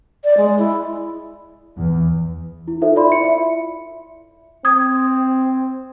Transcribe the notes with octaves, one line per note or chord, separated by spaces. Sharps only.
D5
G#3
E4
E2
E4
D#4 F4 A4 C5 E5
F4 D5 B5 C6
E4 C#7
E5
C4 D#6 G#6